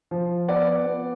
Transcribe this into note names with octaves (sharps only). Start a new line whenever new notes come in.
F3
B3 D5 F#5
B3